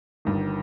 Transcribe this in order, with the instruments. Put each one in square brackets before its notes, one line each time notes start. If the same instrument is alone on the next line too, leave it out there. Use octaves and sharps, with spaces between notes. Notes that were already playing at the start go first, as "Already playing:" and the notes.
[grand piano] G1 G2 D#3